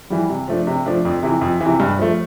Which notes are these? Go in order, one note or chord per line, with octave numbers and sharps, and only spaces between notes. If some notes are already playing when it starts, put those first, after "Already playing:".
E3 G3
C3
F3 A3 D4
C3
F3 A3 D4
F2
C3 E3
F2
C3 E3
G2
F3 A3